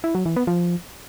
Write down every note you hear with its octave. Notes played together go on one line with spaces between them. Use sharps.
E4
F#3
E3
B3
F3